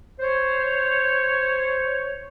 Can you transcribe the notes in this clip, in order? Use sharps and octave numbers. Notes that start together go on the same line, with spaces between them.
C5 C#5